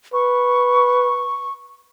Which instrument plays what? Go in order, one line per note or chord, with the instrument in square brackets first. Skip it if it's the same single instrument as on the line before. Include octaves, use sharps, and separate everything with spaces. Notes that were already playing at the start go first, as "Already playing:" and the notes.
[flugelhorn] B4 [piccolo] C#6